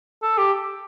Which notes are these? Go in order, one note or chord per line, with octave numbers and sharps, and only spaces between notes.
A4
G4